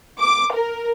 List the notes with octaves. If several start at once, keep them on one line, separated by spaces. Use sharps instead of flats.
D6
A#4